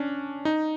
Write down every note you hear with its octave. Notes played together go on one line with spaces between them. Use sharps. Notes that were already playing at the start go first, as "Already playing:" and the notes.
Already playing: C#4 D4
D#4